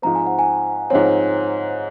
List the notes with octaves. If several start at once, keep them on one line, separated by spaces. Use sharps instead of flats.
G#2 F3 C4 A#5
G#5
F#5
G#5
G#2 F3 C4 C#5